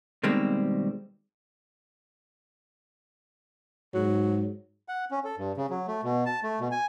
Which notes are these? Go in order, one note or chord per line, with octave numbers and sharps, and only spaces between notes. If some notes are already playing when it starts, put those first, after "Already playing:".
B2 D#3 G3 G#3 A#3 C4
G#2 F#3
F#5
C#4
A4
G2
C#3
F#3
A3
B2
A5
A3
B2
G#5